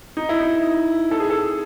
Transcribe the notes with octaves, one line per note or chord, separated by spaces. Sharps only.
D#4
E4
D#4
A4
G#4
A4